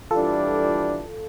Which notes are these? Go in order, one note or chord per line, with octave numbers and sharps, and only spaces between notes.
E3 G3 D4 F4 A4